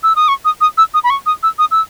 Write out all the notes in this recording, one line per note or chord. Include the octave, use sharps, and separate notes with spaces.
E6
D#6
C#6
D#6
D#6
E6
D#6
B5
C#6
D#6
E6
D#6
E6